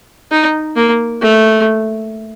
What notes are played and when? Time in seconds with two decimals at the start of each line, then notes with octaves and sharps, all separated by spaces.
0.31 D#4
0.76 A#3
1.22 A3